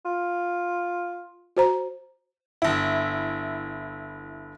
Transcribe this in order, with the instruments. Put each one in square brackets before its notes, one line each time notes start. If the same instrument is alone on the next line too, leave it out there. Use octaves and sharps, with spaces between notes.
[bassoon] F4
[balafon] F#4 C5 A#5
[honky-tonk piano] G1 E4